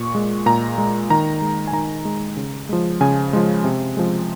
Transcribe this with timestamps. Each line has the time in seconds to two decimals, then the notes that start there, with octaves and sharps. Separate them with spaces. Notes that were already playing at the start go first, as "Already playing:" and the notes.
Already playing: A#2 C#6
0.15 G#3
0.46 A#2 A#5
0.78 G#3
1.10 D#3 A#5
1.42 G#3
1.67 G#5
1.73 D#3 A#5
2.05 G#3
2.37 C#3
2.69 F3 G#3
3.01 C#3 G#5
3.33 F3 G#3
3.64 C3
3.97 F3 G#3